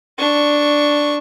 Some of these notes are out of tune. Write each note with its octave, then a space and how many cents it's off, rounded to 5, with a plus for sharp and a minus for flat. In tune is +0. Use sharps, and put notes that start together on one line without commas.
D4 +0 C#6 +0